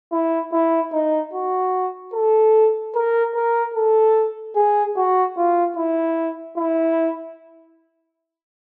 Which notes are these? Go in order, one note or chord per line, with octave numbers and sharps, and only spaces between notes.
E4
E4
D#4
F#4
A4
A#4
A#4
A4
G#4
F#4
F4
E4
E4